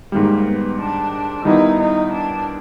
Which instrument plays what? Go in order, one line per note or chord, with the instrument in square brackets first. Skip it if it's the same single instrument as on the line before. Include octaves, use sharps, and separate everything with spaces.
[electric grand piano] G#2 D#3 G3 [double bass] A#3
[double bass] B3
D4
[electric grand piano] D#3 G3 B3 E4 [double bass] D#4
[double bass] D#4
D4